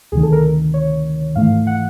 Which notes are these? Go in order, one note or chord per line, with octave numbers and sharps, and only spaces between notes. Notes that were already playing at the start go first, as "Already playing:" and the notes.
D2 C3 D#3 G#4
A4
A#4
C#5
G#2 E3 A3 F5
F#5